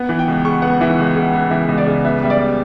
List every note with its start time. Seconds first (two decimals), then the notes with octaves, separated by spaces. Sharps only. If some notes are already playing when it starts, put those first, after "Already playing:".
Already playing: B3 F#5
0.09 E3
0.19 G5
0.28 C#2
0.45 C#3 C#6
0.62 B3 F#5
0.81 E3 E5
0.99 C#2
1.15 C#3
1.33 B3
1.51 E3 E5
1.69 C#2
1.78 D5
1.86 C#3
2.04 B3 E5
2.22 G3 E5
2.30 D5